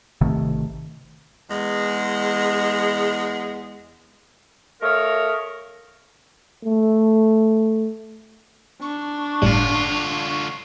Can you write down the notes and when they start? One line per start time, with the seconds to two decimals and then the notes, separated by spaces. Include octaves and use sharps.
0.21 G#1 C3 D#3 A3
1.49 E2 G#3
4.81 A3 A#4 C#5 D#5 F5
6.64 A3
8.82 D4 C#6
9.42 G1 A2 D3 G3 F4